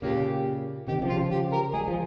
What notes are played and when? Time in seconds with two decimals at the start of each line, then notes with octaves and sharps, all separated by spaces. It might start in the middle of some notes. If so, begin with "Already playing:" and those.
0.02 A#2 C#3 A#3 G4
0.87 C3 D#3 G4
0.98 G3
1.02 C#3 F3
1.09 F4
1.17 C#3 F3
1.31 G4
1.52 A#4
1.73 G#3 G#4
1.80 G3
1.88 F3